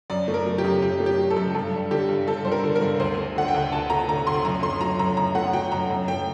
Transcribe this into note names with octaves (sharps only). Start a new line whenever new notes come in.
F#2 D5
A3
A#4
F#3
G4
F#2
F#2 G4
A3
G4
F#3
A4
F#2
G2 A4
G3
D3 G4
G2
G2 A4
G3 C5
A#4
D3
A#4
G2
D2 C5
A3
D3 F#5
G5
D2
D2 A5
A3 A#5
D3 A#5
D2 C6
F#2 A#5
A3 C6
F#3 A#5
F#2 A#5
F#2 A#5
A3 F#5
F#3 G5
F#2 A#5
F#2
A3 G5